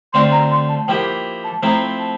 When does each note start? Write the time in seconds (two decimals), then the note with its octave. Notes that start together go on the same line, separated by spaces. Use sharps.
0.13 D3 A3 C4 F4 C6
0.32 A#5
0.51 C6
0.69 A5
0.88 F3 A#3 E4 G4 G5
1.44 A5
1.63 F3 A3 C4 E4 A#5
1.99 A5